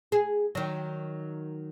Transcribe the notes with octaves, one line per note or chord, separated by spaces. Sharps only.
G#4
D#3 F#3